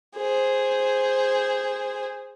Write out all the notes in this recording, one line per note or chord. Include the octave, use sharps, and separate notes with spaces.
G#4 C5